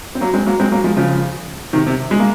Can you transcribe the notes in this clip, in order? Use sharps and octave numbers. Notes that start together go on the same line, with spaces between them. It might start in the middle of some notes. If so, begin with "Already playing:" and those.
C4
F#3 A#3
G#3 C4
F#3 A#3
G#3 C4
F#3 A#3
F3 G#3
C#3 F3
C3 D#3
C3
G#3
A#3